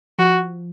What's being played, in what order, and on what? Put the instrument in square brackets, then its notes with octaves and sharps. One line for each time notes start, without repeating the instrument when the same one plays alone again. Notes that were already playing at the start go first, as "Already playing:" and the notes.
[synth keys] F3 [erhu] F#4